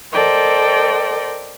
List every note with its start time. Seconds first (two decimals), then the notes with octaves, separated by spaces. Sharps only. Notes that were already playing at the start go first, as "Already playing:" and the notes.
0.13 A4 A#4 C5 D5 D#5 G5